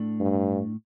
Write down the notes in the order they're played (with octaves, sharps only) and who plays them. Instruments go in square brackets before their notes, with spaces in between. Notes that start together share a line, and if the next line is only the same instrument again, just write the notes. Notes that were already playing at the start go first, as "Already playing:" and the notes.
Already playing: [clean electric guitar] A2 A3 D4
[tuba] G2